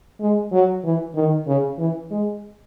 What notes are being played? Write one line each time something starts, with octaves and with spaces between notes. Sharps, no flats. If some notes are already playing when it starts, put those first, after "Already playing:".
G#3
F#3
E3
D#3
C#3
E3
G#3